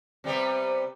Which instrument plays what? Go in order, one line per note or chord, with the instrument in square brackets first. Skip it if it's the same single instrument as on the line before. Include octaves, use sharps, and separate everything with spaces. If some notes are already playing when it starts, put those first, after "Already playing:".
[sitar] C3 G3 B3